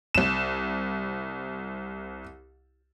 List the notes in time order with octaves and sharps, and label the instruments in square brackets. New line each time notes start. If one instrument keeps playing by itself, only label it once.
[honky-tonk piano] C2 E7